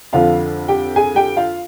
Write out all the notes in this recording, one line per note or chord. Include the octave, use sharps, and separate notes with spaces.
F2 D3 F3 F4 F5
G4 G5
G#4 G#5
G4 G5
F4 F5